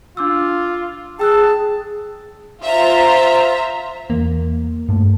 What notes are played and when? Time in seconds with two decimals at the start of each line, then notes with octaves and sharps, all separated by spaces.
0.17 D4 F4 D6 E6
1.19 G#4 G5 A5 E6 F#6
2.64 F4 C5 E5 A#5
4.10 E2 A#3
4.88 G2 A3